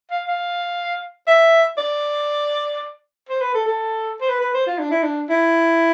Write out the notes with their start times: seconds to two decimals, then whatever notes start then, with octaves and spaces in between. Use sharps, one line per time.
0.11 F5
0.28 F5
1.27 E5
1.78 D5
3.29 C5
3.41 B4
3.54 A4
3.66 A4
4.21 C5
4.29 B4
4.41 B4
4.54 C5
4.67 F4
4.79 D4
4.91 E4
5.03 D4
5.30 E4